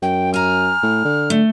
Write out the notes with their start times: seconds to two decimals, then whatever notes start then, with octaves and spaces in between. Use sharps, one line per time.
0.02 F#2 G5
0.34 G#5 A#5 F6
0.83 A2
1.05 D3
1.30 A3